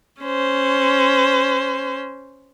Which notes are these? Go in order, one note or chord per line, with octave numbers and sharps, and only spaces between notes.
C#4 C5